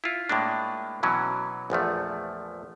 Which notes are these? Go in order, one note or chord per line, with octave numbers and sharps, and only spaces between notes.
E4 F4
A2 G#3 A#3 D4
B2 E3 F#3 C#4
A#1 E2 F3 A3